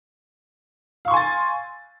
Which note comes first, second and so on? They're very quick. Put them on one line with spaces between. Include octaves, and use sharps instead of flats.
F5 C#6 C6 G#5 A6